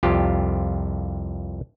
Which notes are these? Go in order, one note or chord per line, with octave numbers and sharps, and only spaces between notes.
C2 F2 F4 G4